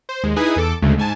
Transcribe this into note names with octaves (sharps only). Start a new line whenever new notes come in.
C5
D#2 G#3
D#4 E4 G#4 B4 G#5 D#6
E2 A4 D6
D2 C#3 G#3 A3
G#2 G#5 A5